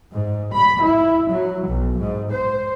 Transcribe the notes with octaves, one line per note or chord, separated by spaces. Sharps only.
G#2
B5
E4
F#3
B1
G#2
C5